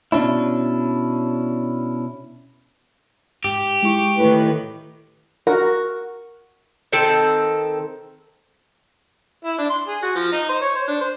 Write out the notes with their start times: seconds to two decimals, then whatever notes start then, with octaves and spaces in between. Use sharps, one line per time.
0.12 B2 C#4 D4 E4
3.44 G#2 G4
3.83 G#3 E4 C#6
4.18 A2 D#3 B4
5.47 F#4 A#4
6.92 D#3 C4 A4
9.45 E4
9.59 D4
9.70 C6
9.88 G#4
10.03 F#4
10.15 F3
10.32 D#4
10.49 C5
10.61 C#5
10.76 C5
10.88 D4
11.01 C5